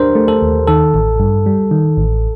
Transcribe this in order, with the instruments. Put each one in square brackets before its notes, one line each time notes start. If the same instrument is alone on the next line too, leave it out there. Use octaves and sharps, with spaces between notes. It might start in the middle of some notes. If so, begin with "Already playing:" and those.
Already playing: [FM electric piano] D4 [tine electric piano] G4 A#4 C5
[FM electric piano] A3
[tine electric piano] A4
[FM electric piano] D#2
[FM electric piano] D#3 [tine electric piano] A4
[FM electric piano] A1
G2
G3
D#3
A1